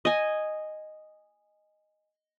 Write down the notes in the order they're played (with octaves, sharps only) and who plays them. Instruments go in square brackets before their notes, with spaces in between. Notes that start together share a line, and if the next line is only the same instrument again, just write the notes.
[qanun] D#5 G#5